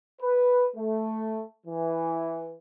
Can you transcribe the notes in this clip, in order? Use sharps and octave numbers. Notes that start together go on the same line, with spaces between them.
B4
A3
E3